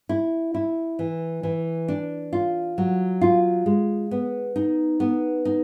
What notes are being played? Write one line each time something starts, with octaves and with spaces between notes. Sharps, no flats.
E4
E4
E3
E3
D4
F4
F#3
F4
G#3
B3
D#4
B3
D#4